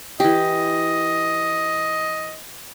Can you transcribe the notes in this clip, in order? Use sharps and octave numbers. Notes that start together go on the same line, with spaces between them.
E3 G4 D#5